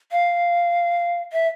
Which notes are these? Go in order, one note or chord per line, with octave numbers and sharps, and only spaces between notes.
F5
E5